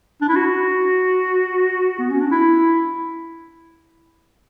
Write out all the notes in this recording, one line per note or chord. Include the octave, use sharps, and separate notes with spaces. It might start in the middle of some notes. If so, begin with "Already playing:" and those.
D4
E4
F#4
B3
C#4
D4
E4